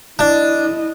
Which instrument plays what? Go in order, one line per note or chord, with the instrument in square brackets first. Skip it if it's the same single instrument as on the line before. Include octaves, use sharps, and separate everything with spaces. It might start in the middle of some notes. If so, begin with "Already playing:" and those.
[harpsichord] D4 [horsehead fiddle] E4 D#5